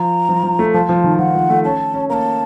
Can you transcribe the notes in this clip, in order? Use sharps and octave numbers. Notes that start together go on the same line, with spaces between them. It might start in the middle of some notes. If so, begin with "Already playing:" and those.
Already playing: F3 A#5
F3
F3
A3
F3 A5
F3
D#3
F3 F#5
F3
A3
C#4 A5
C#4
A#3 A#5
A5